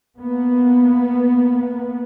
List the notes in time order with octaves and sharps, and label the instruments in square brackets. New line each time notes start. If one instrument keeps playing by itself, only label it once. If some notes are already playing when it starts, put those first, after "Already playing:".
[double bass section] A#3 B3